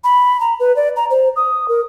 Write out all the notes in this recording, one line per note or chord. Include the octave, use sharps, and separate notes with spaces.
B5
A#5
B4
D5
A#5
C5
D#6
A#4